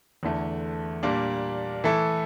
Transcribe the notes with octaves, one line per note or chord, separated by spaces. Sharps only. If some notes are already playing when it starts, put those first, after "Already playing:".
E2 D3 A3
A#2 G3 A#3 D4
E3 A3 E4 A4